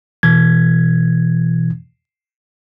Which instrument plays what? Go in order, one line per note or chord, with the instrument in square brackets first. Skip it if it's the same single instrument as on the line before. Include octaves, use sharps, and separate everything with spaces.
[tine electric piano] B2 E3 G#6